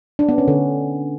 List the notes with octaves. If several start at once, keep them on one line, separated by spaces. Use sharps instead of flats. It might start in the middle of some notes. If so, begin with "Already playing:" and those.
D4
B3
C#4
D3